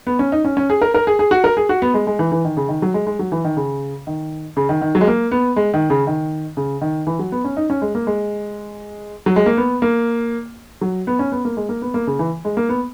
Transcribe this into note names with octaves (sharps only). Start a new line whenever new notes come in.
B3
C#4
D#4
C#4
C#4
G#4
A#4
A#4
G#4
G#4
F#4
A#4
G#4
F#4
B3
G#3
G#3
E3
E3
D#3
C#3
D#3
F#3
G#3
G#3
F#3
E3
D#3
C#3
D#3
C#3
D#3
D#3
F#3
G#3
A#3
B3
G#3
D#3
C#3
D#3
C#3
D#3
E3
F#3
B3
C#4
D#4
C#4
G#3
A#3
G#3
F#3
G#3
A#3
B3
A#3
F#3
B3
C#4
B3
A#3
G#3
A#3
B3
A#3
C#3
E3
G#3
A#3
B3